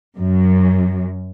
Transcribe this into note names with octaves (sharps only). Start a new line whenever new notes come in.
F#2